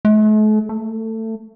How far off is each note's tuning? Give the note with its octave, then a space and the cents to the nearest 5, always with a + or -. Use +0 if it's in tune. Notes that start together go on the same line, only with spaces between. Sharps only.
A3 -45
A3 +20